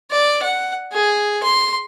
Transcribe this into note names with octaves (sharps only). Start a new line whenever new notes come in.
D5
F#5
G#4
C6